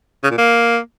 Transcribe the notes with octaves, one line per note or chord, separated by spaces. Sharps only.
C#3
A#2
A#3